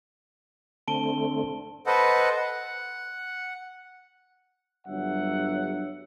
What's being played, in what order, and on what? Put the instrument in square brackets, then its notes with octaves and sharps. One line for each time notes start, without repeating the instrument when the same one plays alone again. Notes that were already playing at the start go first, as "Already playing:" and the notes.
[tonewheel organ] D3 A3 C4 [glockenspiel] A5 D7 G7
[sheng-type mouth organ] A4 B4 C5 D#5 F#5
F#5
[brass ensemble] G1 G2 F#3 E5 F#5